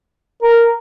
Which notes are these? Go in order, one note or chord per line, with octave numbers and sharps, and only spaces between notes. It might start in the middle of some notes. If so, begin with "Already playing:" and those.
A#4